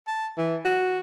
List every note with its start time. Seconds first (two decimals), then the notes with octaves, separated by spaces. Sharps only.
0.08 A5
0.38 E3
0.65 F#4